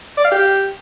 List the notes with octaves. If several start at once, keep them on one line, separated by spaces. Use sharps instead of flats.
D5
F5
G4